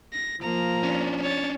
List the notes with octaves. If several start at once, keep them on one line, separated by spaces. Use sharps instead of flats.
A#6
F3 A#3 A#5
C#4 D4
C#5 A6